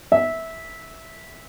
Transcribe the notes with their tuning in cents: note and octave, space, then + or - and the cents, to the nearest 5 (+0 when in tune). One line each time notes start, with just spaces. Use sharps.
E5 -15